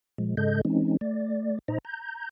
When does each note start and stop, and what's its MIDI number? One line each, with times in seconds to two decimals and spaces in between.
0.18 0.35 46
0.18 0.35 53
0.18 0.35 56
0.37 0.61 44
0.37 0.61 49
0.37 0.61 56
0.37 0.61 69
0.37 0.61 75
0.37 0.61 91
0.65 0.97 52
0.65 0.97 56
0.65 0.97 60
0.65 0.97 61
0.65 0.97 63
1.01 1.59 57
1.01 1.59 74
1.68 1.78 46
1.68 1.78 63
1.68 1.78 72
1.68 1.78 75
1.68 1.78 82
1.85 2.29 82
1.85 2.29 91